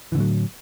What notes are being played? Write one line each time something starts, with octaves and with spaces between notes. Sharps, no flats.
A2 D3 E3 F#3